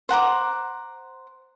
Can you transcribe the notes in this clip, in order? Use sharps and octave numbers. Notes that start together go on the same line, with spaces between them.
C5 F#5 A#5 D6